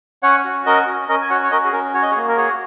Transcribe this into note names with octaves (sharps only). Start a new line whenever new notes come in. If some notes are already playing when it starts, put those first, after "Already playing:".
C#4 C#5 F#5
F#4
C#4 A#4 D#5
C#4
C#4 A#4 D#5
G#5
F#4 C#5 F#5
C#5
C#4 A#4 D#5
G#4
C#4 A#4
F#4 C#5
D#5
G#4 C#5
A#3
A#4
F#4 G#4 C#5